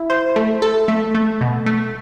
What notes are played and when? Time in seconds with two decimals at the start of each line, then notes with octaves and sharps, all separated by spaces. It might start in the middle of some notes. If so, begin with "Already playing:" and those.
Already playing: E4
0.10 C5
0.36 A3
0.62 A4
0.88 A3
1.15 A3
1.41 B2
1.66 A3